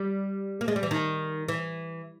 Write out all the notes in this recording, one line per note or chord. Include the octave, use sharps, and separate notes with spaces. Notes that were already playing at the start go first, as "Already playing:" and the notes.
Already playing: G3
A#3
G#3
G3
E3
D#3
E3